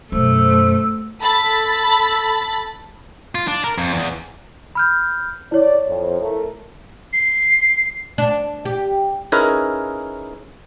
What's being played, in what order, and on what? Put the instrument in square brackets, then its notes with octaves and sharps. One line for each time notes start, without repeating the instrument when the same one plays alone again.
[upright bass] F#2 B2 [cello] A3 [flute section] C5 E6
[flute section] A4 A5 E6 [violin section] B5 A6
[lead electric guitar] F4
D4
A#4
F2
E2
[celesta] B5 F6 G6
[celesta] E4 C#5 [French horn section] D5
[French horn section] F2
A3 A#4
[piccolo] C7
[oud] D4
G4
[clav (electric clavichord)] C#4 D#4 E4 G#4 A#4 B4